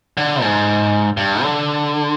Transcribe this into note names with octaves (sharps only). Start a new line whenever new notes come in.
D3
G#2
G2
D3